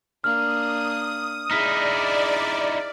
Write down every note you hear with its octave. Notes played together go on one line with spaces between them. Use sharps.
A#3 D4 D#6 F6
D#4 E4 G#4 D5 F6 B6